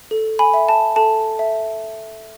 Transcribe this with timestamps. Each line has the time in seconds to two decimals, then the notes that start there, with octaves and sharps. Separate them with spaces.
0.11 A4
0.39 G#5 B5
0.54 E5
0.69 A5
0.96 A4 A5
1.39 E5